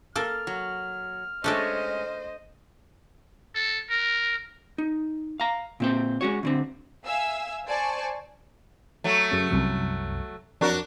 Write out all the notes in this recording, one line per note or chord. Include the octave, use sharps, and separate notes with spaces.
A#3 A4 F6
F#3
G#3 A3 C#4 D4 A4 C5 D#5
A4
A#4
D#4
F5 A#5
A#2 C4 C5
G#3 C#4 F#4 C#5
D2 D3 C4
E5 F5 G#5 E6
C5 D5 G#5 A5 C#6
F#3 A3
F#2 C#3
C2 F#2
F2 F#3 D4 F#4 A#4